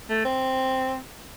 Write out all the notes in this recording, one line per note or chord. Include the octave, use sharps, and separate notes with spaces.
A3
C4